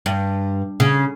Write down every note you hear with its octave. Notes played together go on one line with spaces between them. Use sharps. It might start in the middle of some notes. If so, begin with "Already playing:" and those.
G2
C#3